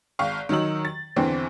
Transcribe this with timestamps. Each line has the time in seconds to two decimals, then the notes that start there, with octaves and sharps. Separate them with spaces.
0.19 G#1 F5 C#6
0.49 D#3 F#3 D#4 E6 F#7
0.85 A6
1.16 E2 D3 E3 C4